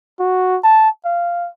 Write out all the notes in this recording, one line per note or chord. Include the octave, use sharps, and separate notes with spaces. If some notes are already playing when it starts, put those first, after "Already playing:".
F#4
A5
F5